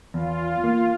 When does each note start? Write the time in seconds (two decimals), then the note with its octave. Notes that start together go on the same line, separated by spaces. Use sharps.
0.14 E2 F4
0.64 A#3